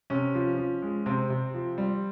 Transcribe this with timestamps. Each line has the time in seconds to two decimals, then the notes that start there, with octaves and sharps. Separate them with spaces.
0.10 C3 C#4
0.35 F3
0.58 F3
0.82 G#3
1.06 C3 C4
1.30 C3
1.54 F3
1.78 G3